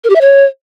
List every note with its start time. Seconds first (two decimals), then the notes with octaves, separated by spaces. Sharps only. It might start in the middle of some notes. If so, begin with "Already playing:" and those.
0.04 A#4
0.10 G4
0.15 E5
0.21 C#5